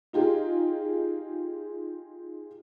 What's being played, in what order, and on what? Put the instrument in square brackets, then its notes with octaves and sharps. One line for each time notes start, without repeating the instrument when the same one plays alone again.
[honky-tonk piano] D#4 F4 G4 G#4